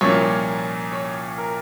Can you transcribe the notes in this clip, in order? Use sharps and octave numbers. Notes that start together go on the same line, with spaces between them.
C2 A#2 F3 A#3 C#4 C#5
C#5
A#4